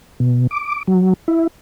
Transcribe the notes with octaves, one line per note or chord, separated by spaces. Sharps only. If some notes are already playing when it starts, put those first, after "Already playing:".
B2
D6
F#3
E4